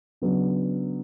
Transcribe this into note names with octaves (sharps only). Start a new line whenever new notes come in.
C#3 F#3 B3 D4